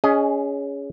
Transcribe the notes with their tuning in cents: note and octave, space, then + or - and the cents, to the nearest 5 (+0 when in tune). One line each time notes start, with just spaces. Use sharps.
C#4 +20 G#4 -5 D#5 +0